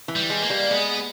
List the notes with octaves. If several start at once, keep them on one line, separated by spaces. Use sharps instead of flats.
E3
G3
G#3
A#3
G3
G#3 B3